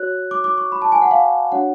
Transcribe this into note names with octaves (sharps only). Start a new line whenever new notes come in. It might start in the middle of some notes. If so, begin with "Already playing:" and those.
Already playing: F#4 C#5 F#6
D6
D6
C#6
B5
A5
G#5
F#5
F5
D4 F#4 C#5 F#5